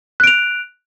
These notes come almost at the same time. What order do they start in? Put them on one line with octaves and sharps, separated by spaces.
F#6 D7 F7